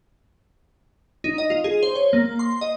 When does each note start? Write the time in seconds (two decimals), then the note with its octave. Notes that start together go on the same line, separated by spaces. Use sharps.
1.24 D#4
1.38 D#5
1.50 F4
1.64 G#4
1.83 C5
1.95 C#5
2.13 A#3
2.39 C6
2.61 D#5